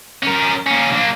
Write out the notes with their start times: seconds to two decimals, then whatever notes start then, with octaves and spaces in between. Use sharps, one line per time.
0.23 C#4 A#4
0.66 A#3 C#4
0.92 A#3 D4